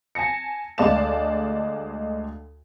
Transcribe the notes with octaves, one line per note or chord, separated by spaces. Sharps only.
G#5 A5 A#6 C#7
D2 G#3 D5 F5 A5 E7